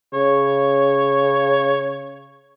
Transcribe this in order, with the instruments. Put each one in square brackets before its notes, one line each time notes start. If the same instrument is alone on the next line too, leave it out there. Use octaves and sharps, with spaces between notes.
[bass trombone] C#3 [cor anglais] C#5